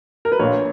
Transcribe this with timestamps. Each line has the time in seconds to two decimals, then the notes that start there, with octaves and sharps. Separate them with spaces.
0.25 A#4
0.32 B4
0.39 A#1 A#2 C#5